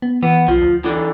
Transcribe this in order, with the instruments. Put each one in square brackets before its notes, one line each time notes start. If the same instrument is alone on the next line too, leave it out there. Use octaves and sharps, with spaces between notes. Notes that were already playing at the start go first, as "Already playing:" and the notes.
[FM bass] B3
[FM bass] E3 [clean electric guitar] B3
[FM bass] B1 [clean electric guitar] F3
[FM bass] D2
[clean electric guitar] D3 E3